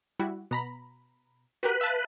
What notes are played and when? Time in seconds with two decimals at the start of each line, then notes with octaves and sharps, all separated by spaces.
0.19 G3 E4 F#4
0.51 B2 A#5 B5
1.63 F#4 G4 A#4 B4
1.81 E5 F5 A5